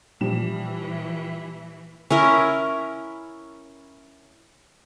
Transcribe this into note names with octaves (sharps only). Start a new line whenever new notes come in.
A#2 E3 F3 G3 E4 E7
C#4 E4 A#4